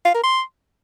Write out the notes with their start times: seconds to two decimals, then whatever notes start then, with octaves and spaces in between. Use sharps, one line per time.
0.05 F5
0.14 A#4
0.24 C6